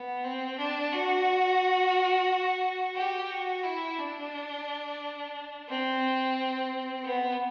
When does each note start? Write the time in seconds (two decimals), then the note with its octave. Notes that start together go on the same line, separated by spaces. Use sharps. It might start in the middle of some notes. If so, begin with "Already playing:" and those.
Already playing: B3
0.24 C4
0.58 D4
0.92 F#4
2.96 G4
3.30 F#4
3.64 E4
3.98 D4
5.68 C4
7.04 B3